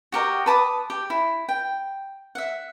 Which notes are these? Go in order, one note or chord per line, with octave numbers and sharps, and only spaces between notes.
F#4 G4 A#4 D#5
B4 A5 D6 D#6
G4
E4
G5
E5 F#5